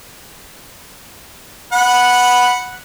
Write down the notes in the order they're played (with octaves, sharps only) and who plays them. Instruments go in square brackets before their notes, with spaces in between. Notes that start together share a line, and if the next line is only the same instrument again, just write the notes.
[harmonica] F#5 B5